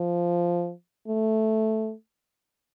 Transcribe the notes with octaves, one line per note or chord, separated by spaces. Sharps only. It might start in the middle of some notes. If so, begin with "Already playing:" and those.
Already playing: F3
A3